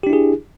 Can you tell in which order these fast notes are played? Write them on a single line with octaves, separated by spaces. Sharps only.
G4 D4 E4 G#4